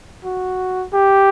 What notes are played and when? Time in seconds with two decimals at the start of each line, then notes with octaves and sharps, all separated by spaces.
0.24 F#4
0.93 G4